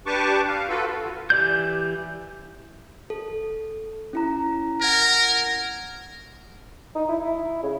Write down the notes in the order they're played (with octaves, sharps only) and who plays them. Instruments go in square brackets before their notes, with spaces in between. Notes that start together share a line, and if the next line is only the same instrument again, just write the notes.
[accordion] D4 G4 B4 A5 C#6 D6
F5
F4 F#4 A4 B4
[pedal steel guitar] E3 G4 D5 G6
[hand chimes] A4
C#4 E4 A#5
[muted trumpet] A#4 [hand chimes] F#5 G#6 A#6
[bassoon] D#4
E4
E4
C#3